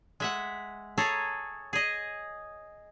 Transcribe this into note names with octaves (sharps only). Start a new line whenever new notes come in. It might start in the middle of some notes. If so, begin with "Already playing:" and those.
G#3 E5 F#5
G#4 A4 C#5 G#5 A#5
G#4 D#5